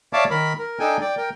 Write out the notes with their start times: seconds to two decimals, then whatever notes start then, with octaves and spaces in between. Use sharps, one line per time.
0.13 C#5 D5 E5 F5 A5 D6
0.30 D#3 A#4 B5
0.59 A#4
0.79 D4 D#4 A4 G5 G#5
1.01 D5 G5
1.17 A#4 G5